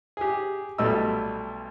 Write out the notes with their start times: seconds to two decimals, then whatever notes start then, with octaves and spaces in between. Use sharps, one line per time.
0.17 G4 G#4
0.78 B1 G3 A3 D#5 E6